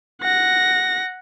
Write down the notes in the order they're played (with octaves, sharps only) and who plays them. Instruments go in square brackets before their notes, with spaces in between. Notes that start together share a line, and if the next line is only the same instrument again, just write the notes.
[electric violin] F#5 A#6